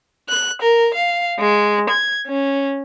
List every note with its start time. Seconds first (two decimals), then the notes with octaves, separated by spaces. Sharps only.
0.29 F#6
0.61 A#4
0.94 F5
1.38 G#3
1.89 G#6
2.27 C#4